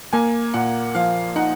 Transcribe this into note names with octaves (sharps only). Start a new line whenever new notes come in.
A#3 G#5
A#2 F#5
F3 F5
D#4 F#5